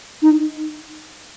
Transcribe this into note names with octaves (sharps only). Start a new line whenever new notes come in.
D#4